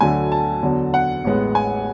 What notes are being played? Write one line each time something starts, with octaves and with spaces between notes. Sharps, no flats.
D2 D3 F#3 A3 G#5
A5
E2 D3 F#3
F#5
A1 A2 G#3 B3
G#5